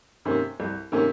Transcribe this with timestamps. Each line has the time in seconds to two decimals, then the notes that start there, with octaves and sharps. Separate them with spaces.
0.25 C3 D#3 A#3 C#4
0.60 C2
0.92 C3 D#3 A#3 C#4